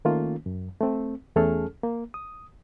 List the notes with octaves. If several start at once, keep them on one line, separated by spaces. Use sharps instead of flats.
D#3 A3 A#3 C#4 F4
F#2
A3 C4
E2 A3 C#4 G#4 A4 F6
A#3
D#6